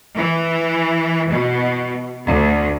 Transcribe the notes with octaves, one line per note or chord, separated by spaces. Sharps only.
E3
B2
D2